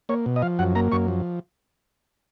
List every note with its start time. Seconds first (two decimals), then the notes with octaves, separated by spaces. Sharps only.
0.09 A#3 C#5
0.26 B2
0.36 D#5
0.42 F3 F5
0.59 F#2 F#5
0.75 A#3 A#5
0.92 F#2 C#6
1.08 F3